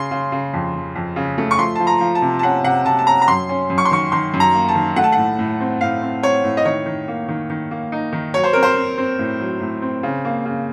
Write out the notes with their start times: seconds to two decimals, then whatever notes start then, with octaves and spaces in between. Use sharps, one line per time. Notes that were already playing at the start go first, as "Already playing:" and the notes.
Already playing: C#3 C6
0.11 C#3
0.32 C#3
0.54 F2
0.74 F2
0.95 F2
1.16 C#3
1.38 A3
1.51 C#6
1.59 F3 C6
1.75 F3 A5
1.87 A#5
2.01 F3
2.15 A5
2.22 C3
2.39 A5
2.43 C#4 F#5
2.64 C3 F#5
2.85 C3 A5
2.99 A5
3.07 C#4 A#5
3.22 A#5
3.28 F#2 C6
3.49 C#4
3.70 F#2
3.78 C#6
3.85 C6
3.91 D#3 C#6
4.12 D#3 C6
4.34 F#2
4.40 A#5
4.54 A#3
4.68 A5
4.75 D#3
4.96 A3 F#5
5.04 A5
5.12 A2 F#5
5.39 A2
5.60 C4
5.81 A2 F5
6.02 C4
6.23 C4 C#5
6.44 A2
6.57 D#5
6.65 D#3 C#5
6.86 D#3
7.08 A#3
7.28 D#3
7.50 D#3
7.71 A#3
7.92 D#4
8.13 D#3
8.34 F#3 C#5
8.44 C5
8.53 C4 A#4
8.63 C5
8.76 C4
8.98 C4
9.19 A2
9.40 F#3
9.60 A2
9.82 C4
10.03 C#3
10.25 A#3
10.45 C#3